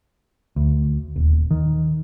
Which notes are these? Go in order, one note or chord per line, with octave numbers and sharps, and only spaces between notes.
D2
D#1
D#3